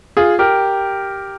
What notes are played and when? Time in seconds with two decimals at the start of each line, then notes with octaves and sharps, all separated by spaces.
0.17 F4 G#4
0.39 G4 A#4